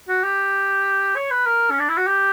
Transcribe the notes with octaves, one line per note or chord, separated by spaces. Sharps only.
F#4
G4
C#5
B4
A#4
C#4
D4
E4
F#4
G4